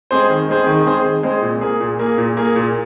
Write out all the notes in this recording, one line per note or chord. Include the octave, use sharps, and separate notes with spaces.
G#3 C4 G#4 C5
D#3
G#3 C4 G#4 C5
D#3
G#3 C4 G#4 C5
D#3
G#3 C4 G#4 C5
A#2
A#3 G#4
A#2
A#3 G#4
A#2
A#3 G#4
A#2